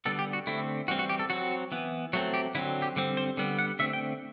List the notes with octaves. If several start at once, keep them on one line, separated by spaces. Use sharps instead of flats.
D3 G3 B3 A4
G4
F#4
D3 A3 C4 E4
E3 G3 C4 F#4
F#4
G4
A4
F#3 C4 F#4
E3 B3
F#3 A3 C4 F#4
G4
D3 F#3 C4 E4
G4
D3 G3 C4
C5
D3 G3 B3
F#5
D3 A3 C4 E5
G5